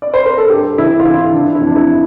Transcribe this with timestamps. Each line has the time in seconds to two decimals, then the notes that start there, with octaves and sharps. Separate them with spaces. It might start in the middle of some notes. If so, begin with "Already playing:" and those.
0.02 D5
0.14 C5
0.26 A#4
0.38 A4
0.50 G2 G4
0.78 E3 E4
1.00 F4
1.05 E3 E4
1.34 E3 D4
1.55 E4
1.61 F2
1.67 D4
1.76 E4
1.89 C3